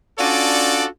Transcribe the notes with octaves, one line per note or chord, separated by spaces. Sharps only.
C#4 D4 F4 F#4 A4 D5